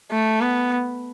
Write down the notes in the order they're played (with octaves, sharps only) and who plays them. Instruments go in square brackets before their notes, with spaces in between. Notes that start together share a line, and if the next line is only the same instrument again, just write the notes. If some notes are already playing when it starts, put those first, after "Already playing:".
[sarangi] A3
B3